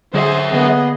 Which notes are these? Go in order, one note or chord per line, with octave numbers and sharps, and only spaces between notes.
D3 F#3 G#4 C5 E5
D3 A#3 B3 G#4 D#5